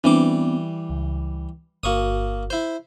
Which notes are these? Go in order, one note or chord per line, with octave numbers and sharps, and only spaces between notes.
E3 G3 B3 C4 D4 D6
C#2
G1 A#3 F#4 C#6 D#6
E4 C5